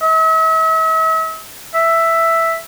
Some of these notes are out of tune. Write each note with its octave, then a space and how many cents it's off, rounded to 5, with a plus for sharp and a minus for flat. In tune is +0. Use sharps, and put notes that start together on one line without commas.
E5 -40
E5 +5